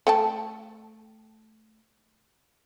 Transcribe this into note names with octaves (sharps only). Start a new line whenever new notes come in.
A3 G5 A5